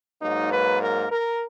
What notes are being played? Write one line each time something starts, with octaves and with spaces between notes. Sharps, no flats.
G#2 F#3 A#3 D#4
B4
A#4
A#4